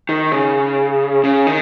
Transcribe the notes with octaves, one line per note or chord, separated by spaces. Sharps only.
D#3
C#3
C#3
D#3